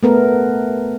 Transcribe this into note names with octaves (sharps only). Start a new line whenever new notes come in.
A3 B3 A#4